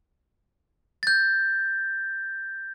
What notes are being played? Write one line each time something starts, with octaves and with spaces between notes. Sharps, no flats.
G6 A6